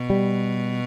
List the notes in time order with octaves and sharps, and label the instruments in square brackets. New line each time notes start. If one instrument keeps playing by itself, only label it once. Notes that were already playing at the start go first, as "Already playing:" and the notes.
Already playing: [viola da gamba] B2
[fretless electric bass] G3